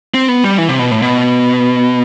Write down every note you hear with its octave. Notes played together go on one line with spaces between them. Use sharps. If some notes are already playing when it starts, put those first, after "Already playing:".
C4
B3
G3
E3
C3
B2
A2
B2